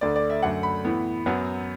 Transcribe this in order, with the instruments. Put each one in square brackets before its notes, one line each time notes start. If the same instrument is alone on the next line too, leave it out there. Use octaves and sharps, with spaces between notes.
[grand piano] D2 D3 A3 D5
D5
E5
F#2 D3 A3 F#5
B5
A2 E3 B3
F#2 F#3 B3